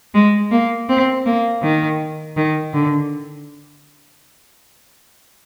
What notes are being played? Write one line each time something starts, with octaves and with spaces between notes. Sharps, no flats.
G#3
A#3
C4
A#3
D#3
D#3
D3